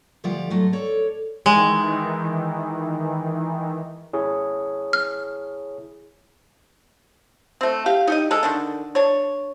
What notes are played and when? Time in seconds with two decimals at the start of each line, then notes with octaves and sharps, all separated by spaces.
0.24 D2 F3 G3 F4 D5 F#5
0.50 G#2 F#3 A3
0.73 A4 C#5 D5
1.46 D#3 E3 G#3
4.13 E4 G#4 C#5
4.93 F6
7.61 A3 C4
7.86 G4 F5
8.07 D#4 G4 D#5
8.31 G#3 A4
8.43 D3 D#3 D4
8.95 D4 C#5